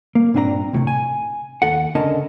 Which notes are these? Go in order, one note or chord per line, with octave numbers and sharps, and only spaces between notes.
A#3
G2 A#2 C4 D4 D#5 A#5
C2 A2 C3
G#5
D#2 A4 F#5
C#2 D3 C#4 A#4 D#5 A5